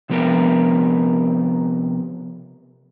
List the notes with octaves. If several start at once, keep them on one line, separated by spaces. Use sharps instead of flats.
C3 F3 B3 G4 A#4